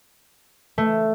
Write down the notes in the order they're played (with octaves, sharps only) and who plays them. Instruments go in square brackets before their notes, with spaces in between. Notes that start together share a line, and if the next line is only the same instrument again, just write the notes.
[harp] A3